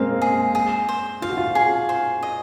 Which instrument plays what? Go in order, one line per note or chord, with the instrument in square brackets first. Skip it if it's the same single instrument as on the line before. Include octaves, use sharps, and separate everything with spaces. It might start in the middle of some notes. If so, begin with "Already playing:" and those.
Already playing: [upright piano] G#3 A#3 C4 [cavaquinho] C5 F5
[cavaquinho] G#4
G#4
C5
[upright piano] F4 [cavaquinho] F5
[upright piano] F#4
F4
[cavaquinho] G#4
C5
D#5